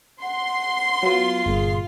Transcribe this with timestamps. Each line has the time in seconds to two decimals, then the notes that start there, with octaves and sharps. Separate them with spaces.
0.22 F#5 C6
1.03 F#3 B3 F4
1.46 G1 A#2 G#4